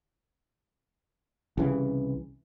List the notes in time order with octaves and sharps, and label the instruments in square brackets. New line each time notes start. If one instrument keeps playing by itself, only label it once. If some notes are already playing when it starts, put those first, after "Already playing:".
[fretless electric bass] C2 C#3 E3